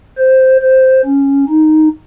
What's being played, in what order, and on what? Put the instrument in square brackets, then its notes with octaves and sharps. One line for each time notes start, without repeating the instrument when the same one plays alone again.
[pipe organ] C5
C5
C#4
D#4